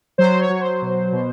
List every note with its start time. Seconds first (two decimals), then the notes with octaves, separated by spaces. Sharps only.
0.18 F#3 C5
0.39 C#5
0.49 F#3
0.60 C5
0.82 B2
1.12 B2